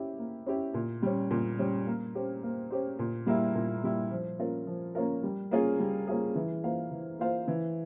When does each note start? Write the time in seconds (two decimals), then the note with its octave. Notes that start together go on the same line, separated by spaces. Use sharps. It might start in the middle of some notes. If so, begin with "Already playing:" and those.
Already playing: C#4 E4 G4
0.18 A#3
0.46 C#4 E4 G4
0.74 A#2
1.02 G3 C#4
1.31 A#2
1.59 G3 C#4
1.87 A#3
2.15 C#4 G4 C5
2.43 A#3
2.70 C#4 G4 C5
2.99 A#2
3.27 G3 A#3 E4
3.55 A#2
3.84 G3 A#3 E4
4.11 F3
4.39 A#3 C#4 F4 A#4
4.67 F3
4.95 A#3 C#4 F4 A#4
5.23 G3
5.51 A#3 C#4 F4 G#4
5.80 G3
6.07 A#3 C#4 F4 G#4
6.35 E3
6.63 A#3 F4 C5 F5
6.91 E3
7.19 A#3 F4 C5 F5
7.48 E3